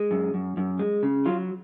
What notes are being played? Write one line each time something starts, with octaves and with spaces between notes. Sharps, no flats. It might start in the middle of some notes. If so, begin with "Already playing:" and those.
Already playing: G#3
F#2
F#2
F#2
G#3
C#3
F#3 F4